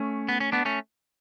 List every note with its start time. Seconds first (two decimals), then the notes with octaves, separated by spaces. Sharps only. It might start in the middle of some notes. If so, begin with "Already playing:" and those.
Already playing: A3 C#4
0.29 B3
0.40 C#4
0.52 B3 D4
0.65 A3 C#4